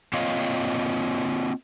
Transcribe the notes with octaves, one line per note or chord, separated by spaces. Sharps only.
A#3 C4 F4 C#5 D#5 F5